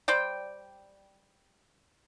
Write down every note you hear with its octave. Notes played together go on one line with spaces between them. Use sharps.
G3 C5 D5 G5